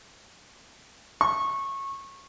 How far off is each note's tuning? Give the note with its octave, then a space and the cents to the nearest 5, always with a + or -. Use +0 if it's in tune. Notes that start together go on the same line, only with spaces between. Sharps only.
C#6 -20